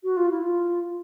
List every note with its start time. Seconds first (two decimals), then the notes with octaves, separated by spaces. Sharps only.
0.03 F#4
0.16 F4
0.30 E4
0.42 F4